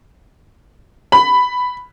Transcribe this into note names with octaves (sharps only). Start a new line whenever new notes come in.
B5